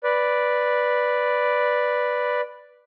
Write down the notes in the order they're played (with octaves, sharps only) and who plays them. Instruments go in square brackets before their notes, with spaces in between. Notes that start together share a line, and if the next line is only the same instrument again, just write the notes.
[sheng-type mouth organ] B4 D5